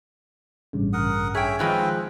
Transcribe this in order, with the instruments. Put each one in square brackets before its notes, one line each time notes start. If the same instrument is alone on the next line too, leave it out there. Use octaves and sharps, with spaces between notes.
[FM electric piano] A1 G2 C#3
[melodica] A#4 F#5 D#6
[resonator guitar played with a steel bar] G#4 G5 [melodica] C#5 E5
[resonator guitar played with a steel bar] D#3 F3 G#3 [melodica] C4 B4 G5